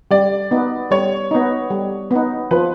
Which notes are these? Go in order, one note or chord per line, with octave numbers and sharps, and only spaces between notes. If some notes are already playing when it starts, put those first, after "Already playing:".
G3 D5
B3 D#4
G3 C#5
B3 D#4
G3
B3 D#4
F3 B4